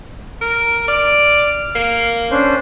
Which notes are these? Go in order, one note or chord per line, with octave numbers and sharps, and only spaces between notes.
A#4
D5 F6
A#3
C#4 D4 C5